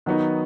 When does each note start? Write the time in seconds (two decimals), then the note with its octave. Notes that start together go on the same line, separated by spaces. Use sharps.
0.06 D#3 F#3 B3 D#4